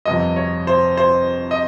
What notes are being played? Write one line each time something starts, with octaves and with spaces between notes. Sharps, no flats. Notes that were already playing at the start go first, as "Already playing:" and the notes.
G1 F2 C3 D#5
C#5
C5
C5
D#5